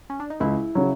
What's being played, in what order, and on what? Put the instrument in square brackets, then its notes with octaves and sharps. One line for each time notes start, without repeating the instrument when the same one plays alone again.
[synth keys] C#4
D4
D#4
[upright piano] C#2 [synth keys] E4
[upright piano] C#3 F#3